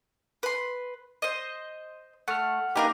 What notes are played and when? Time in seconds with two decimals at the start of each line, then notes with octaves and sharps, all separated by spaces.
0.43 B4 C6
1.22 C5 D#5
2.28 A3 F#5 F6
2.76 A#3 D4 D#4 G4 A#4 B4